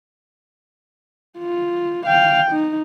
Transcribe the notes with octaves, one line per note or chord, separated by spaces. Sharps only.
F4
F5 G5
D#4